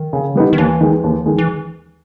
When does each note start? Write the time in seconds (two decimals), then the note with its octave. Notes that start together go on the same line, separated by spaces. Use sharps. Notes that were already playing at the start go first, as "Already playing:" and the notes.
Already playing: D#3
0.13 C#3
0.35 G3 B3 D#4
0.53 D#3
0.58 D#2 E3
0.81 D#3 G#3
1.04 D#2
1.26 D#3 G#3
1.38 E3